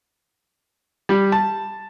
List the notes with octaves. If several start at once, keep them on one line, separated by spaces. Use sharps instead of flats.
G3
A5